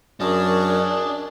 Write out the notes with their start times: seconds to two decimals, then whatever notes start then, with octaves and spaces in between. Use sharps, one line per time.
0.20 F#2 D4 G#4 A#4 A5 C#6